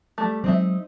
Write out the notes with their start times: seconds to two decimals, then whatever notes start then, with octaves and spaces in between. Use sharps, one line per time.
0.18 G3 A3
0.44 F#3 G#3 C4 D#4 E5